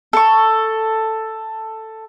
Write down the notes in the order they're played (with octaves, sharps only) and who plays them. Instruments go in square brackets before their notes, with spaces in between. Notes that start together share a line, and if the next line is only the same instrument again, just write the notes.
[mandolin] A4 C#6